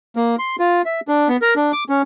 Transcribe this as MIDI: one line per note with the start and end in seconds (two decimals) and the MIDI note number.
0.16 0.36 58
0.39 0.56 84
0.59 0.82 65
0.85 1.00 76
1.08 1.28 62
1.29 1.37 59
1.42 1.54 70
1.56 1.72 62
1.73 1.84 86
1.89 2.02 61